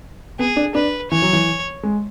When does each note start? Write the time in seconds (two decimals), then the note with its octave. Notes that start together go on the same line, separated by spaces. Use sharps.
0.39 B3 G#4
0.57 D4
0.75 D4 B4
1.11 E3 C#5
1.22 F#3
1.33 E3
1.83 G#3